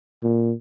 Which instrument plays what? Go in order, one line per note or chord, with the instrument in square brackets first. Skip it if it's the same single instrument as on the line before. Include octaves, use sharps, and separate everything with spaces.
[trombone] A#2